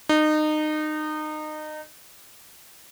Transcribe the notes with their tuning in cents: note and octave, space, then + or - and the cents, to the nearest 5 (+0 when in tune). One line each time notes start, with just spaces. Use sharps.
D#4 -25